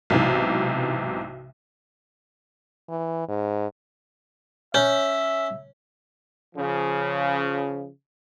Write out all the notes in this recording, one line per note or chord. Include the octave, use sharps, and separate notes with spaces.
B1 G#2 C3 E3
E3
G#2
C#4 C#5 E5
C#3 F3